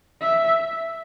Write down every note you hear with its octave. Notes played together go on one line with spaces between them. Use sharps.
E5